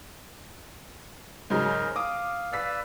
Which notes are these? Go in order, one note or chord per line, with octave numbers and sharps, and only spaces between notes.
G#2 C#3 F#3 A#4 C5 D#5
F5 D6 D#6
B4 D5 F5 E6 B6